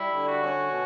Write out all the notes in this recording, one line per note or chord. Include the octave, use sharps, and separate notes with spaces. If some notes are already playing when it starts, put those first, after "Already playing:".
Already playing: G3 E4
D3
F#4
C#4
B2